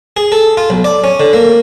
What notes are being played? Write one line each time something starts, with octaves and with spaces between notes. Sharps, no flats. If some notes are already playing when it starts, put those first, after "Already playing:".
G#4
A4
F4
B1
D5
C#4
D3
A#3